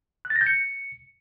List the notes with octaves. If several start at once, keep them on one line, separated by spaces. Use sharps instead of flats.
F#6
A6
A#6
G6
C#7